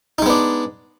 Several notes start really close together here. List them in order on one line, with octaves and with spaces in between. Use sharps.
D#4 G#3 B3 D4